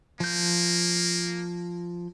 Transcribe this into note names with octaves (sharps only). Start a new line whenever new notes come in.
F3 A#3 G6